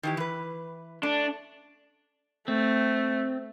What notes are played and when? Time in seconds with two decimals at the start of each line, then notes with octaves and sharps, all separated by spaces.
0.03 D#3 E3 G4
0.17 E3 B4
1.03 A3 D4
2.48 A3 C4